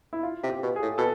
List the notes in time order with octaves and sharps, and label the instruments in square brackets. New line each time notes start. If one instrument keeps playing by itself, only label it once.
[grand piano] E4
F4
[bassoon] C3
[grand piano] G4
[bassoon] B2
[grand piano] G#4
[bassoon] A2
[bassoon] B2 [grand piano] A4